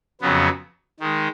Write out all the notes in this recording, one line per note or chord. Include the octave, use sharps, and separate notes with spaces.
F2 C#3 F#3 B3
D#3 G#3